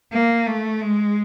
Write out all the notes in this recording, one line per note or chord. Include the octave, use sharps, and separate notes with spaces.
A#3
A3
G#3